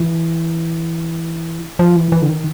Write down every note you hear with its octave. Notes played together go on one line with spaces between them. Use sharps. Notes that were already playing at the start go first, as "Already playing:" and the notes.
Already playing: E3
F3
E3
E3
D3
D#3